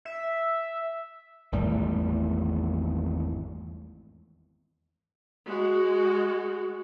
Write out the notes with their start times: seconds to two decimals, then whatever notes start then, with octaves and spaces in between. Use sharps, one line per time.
0.05 E5
1.52 G#1 E2 A2 G3
5.47 G#3 F#4